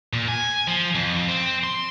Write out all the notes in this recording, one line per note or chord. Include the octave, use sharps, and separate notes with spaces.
A#2
G#5
F3
F2
C4
C6